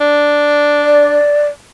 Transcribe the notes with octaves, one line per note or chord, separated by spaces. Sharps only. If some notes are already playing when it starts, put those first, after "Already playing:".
D4
D5